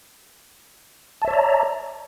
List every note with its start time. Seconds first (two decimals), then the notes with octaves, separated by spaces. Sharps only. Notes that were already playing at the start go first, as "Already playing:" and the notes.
1.22 A5
1.25 E5
1.28 C#5
1.31 D5
1.34 A#5